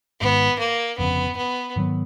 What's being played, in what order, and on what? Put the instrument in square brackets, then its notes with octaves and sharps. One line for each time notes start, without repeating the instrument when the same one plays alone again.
[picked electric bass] G#1 G#2 D#3 [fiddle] B3
[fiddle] A#3
[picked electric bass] G1 F2 C#3 [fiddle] B3
[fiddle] B3
[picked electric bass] G#2 D#3 F#3 B3